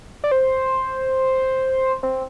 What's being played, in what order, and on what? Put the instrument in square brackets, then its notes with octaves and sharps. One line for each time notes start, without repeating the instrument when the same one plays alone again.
[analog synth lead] D5
C5
C4